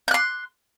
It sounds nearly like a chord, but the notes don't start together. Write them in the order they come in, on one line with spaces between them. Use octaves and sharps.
G6 F#6 C6